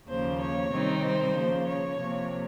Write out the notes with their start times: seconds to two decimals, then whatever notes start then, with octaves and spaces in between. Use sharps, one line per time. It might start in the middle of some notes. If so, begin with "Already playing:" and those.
0.08 D#2 C#3 F3 A#3 C5
0.40 C#5
0.71 C3 D#3 G3 C4 D#4
1.03 C5
1.35 C#3 F3 A#3
1.66 C#5
1.98 C3 F3 A#3